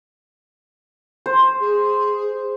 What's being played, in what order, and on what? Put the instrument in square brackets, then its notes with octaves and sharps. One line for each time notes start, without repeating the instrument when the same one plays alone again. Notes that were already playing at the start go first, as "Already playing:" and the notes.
[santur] C5
[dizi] G#4